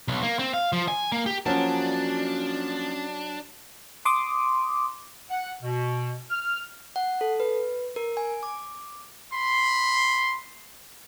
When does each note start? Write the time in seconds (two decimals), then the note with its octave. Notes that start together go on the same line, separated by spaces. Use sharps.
0.08 B1
0.22 A#3
0.39 C4
0.54 F5
0.73 F3
0.88 G#5
1.12 A#3
1.26 G4
1.46 F3 F#3 A#3 C#4 D4 A5
4.05 C6 D6 D#6
5.30 F#5
5.62 B2
6.30 F6
6.96 F#5
7.21 A4
7.40 B4
7.96 A#4
8.17 G#5
8.43 D6
9.33 B5 C6